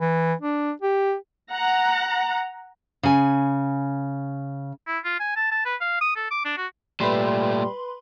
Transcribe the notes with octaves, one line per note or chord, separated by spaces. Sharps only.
E3
D4
G4
F#5 A#5
C#3 G#5
E4
F4
G#5
A5
A5
B4
F5
D#6
A4
D6
D4
F#4
A#2 G3 A3 B4 B5 C6